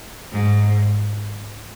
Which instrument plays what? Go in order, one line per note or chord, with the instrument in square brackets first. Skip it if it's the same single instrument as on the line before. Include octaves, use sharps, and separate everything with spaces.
[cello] G#2